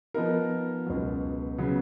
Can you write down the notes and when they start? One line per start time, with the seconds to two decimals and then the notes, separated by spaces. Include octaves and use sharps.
0.14 F3 B3 D#4 A#4
0.86 C#2 B2 F#3
1.58 C#3 F#3 B3